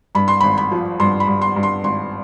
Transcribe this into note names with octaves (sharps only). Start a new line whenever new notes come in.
G2 B5
C6
B5
G#1
B5
F3
G2 C6
B5
G2
C6
G2
C6
G#1 C6